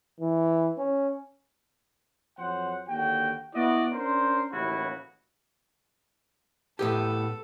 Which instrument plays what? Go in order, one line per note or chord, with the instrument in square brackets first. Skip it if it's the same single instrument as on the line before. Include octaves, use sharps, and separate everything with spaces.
[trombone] E3
C#4
[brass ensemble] F2 F#3 C5 F#5
D#2 D3 F#4 G5
B3 E4 F#4 D5 D#5
C#4 D4 A#4 C5
A1 D#2 C#3 E4 F#4
[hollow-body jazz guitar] A2 B3 G4 [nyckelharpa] A4